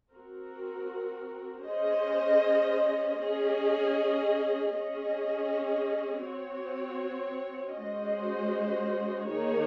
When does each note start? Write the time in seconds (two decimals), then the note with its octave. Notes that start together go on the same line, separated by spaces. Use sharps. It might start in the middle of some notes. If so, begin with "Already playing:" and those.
0.12 C4 F#4 A#4
1.65 C#4 G#4 C5 D#5
3.18 C#4 G#4 D#5
4.71 C#4 G#4 D#5
6.23 C4 F#4 C#5
7.77 G#3 C#4 F#4 C5 D#5
9.29 D#3 A#3 D#4 G#4 C#5